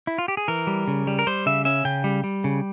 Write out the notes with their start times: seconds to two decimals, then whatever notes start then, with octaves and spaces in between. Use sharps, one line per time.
0.07 E4
0.18 F4
0.28 G4
0.37 G#4
0.48 E3 A#4
0.67 G3
0.88 C#3
1.07 G3
1.19 A#4
1.27 G3 C5
1.46 C#3 E5
1.65 C#4 E5
1.85 C#3 G5
2.04 G3
2.24 G3
2.44 C#3